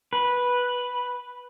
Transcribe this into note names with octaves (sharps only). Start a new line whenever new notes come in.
B4